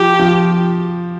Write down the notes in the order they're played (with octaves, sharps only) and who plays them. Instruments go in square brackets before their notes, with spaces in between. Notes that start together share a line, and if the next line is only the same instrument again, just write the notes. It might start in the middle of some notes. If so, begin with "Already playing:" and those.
Already playing: [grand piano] F3 [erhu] G4
[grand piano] F3